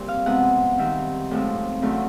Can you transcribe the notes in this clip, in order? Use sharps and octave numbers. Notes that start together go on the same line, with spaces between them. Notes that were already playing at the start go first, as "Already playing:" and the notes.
Already playing: A#2 G3 C4
F5
C3 F3 G#3 B3 F#5
C3 D#3 G3 C4
A2 F3 G#3 C4
E2 C#3 F#3 A3 C4